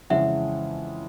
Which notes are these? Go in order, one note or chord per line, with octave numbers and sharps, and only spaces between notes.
F2 C#3 E3 G#3 C#4 E5 F#5